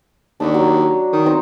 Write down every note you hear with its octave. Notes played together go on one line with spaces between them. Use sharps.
D#2 D4 C#6
F#3
D#3
C4 D#4